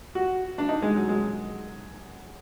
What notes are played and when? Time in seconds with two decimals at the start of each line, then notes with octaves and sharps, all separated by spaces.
0.15 F#4
0.58 D4
0.69 D#4
0.82 G#3
0.96 F#3
1.09 G#3